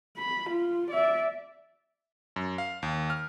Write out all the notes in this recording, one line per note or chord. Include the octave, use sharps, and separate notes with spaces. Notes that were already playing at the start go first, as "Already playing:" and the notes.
B5
F4
D5 E5
F#2
F5
D#2
F6